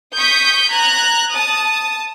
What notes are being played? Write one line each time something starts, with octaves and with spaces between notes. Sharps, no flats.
C#6 D#6 G6 B6
A#5 F#6 G#6
A5 D#6